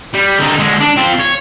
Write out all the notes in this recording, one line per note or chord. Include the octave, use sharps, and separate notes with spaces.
G3
D3 D#4
D3 G#3
D4
C4 F4
C#5